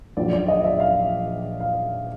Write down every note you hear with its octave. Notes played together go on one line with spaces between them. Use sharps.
A#1 A#2 F#3 D5
D5
D#5
E5
F5
F5